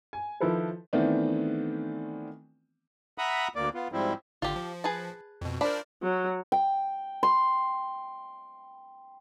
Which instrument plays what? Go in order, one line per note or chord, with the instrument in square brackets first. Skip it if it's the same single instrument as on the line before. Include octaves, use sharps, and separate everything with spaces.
[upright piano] G#5
D#3 F3 E4 A4 B4 C5
[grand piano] D#3 E3 A3 B3 C4 D4
[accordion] E5 F#5 A#5 B5 D#6
D2 A#3 D5
B3 F4
G#2 F3 G3 C4 E4
[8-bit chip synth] G#1 D3 [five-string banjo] F4 G4
[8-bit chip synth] F3
[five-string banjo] G#4 B4 A5
[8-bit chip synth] F2 B2
[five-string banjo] F3 D4 B5 [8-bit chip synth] A#4 C5 D5
[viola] F#3
[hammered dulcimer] G5
C6